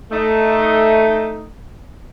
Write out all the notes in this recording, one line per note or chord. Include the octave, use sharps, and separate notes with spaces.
A3 D#4